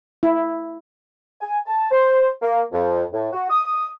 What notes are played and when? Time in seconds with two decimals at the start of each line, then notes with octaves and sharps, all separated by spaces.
0.23 E4
1.40 G#5
1.66 A5
1.90 C5
2.41 A#3
2.72 F2
3.12 A2
3.32 F#4
3.50 D#6